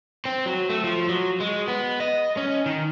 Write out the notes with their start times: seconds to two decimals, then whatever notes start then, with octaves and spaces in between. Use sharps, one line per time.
0.25 C4
0.46 F#3
0.69 A3
0.84 F3
1.09 F#3
1.40 G#3
1.68 B3
2.00 D#5
2.37 C#4
2.66 D#3